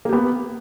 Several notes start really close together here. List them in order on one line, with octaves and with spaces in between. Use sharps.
A#3 G4 B3